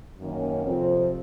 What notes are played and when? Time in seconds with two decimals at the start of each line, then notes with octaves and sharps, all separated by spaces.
0.18 F#2 D#3 A#3 C#4
0.63 F2 C3 F3 C4